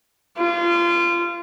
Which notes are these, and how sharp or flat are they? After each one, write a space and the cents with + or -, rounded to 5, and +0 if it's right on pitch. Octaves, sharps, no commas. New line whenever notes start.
F4 -25